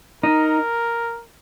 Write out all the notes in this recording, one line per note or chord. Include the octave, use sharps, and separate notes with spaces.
D#4 A#4